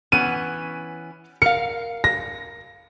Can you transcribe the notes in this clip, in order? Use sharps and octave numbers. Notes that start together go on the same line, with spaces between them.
E3 B3 C#4 D#7
A#4 F5 C#7
A#6